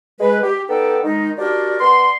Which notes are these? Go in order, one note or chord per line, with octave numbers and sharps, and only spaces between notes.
G#3 B4
G4
B3 D#4 A4 D5 G5
D#3 G#3 D#4
D4 F#4 G4 A#4 D5
B3 D5 C6